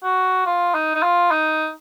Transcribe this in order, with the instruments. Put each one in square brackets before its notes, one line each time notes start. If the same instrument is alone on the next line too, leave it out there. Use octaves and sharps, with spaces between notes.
[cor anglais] F#4
F4
D#4
D#4
F4
D#4